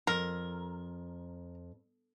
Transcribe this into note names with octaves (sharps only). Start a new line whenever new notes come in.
F2 A#4